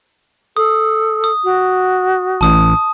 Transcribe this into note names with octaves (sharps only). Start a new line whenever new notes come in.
A4 D#6
D#6
F#4
A1 A5 D#6